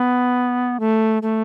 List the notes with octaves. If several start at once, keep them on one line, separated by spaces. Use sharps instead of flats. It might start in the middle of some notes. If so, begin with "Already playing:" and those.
Already playing: B3
A3
A3